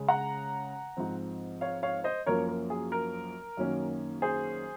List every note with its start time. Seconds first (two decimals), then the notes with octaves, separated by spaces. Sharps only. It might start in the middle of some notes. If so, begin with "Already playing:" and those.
Already playing: C#3 G#3 C#4
0.08 F#5 A#5
0.97 G#2 F3 C4
1.61 C#5 F5
1.83 C#5 F5
2.04 C5 D#5
2.26 F#2 F3 A#3 C#4 A#4 C#5
2.48 A#4
2.70 G#4
2.92 A#4
3.57 F#2 D#3 F#3 A#3 C#4
4.22 G#4 C5